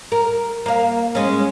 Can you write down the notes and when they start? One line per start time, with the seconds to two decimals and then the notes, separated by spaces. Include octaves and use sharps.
0.12 A#4
0.66 A#3 F5
1.15 G#3 C#4